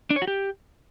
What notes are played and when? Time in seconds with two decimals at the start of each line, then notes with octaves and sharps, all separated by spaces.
0.10 D4
0.16 C#5
0.22 F#4
0.27 G4